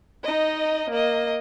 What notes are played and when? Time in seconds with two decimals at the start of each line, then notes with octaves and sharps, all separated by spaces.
0.24 D#4 D#5
0.90 A#3 D#5